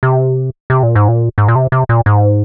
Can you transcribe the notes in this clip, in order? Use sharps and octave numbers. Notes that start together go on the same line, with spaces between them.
C3
C3
A#2
G#2
A#2
G#2
A#2
C3
C3
A#2
G#2